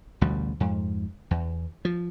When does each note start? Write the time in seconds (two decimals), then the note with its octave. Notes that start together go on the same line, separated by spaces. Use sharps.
0.21 A1 D2 B2 G3
0.60 F2 G#2
1.31 E2
1.85 F3